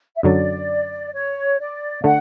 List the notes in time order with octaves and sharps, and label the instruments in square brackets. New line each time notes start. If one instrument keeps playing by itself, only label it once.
[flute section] E5
[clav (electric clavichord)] F#2 D3 F#3 [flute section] D5
[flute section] C#5
D5
[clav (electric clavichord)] D3 A3 [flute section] F#5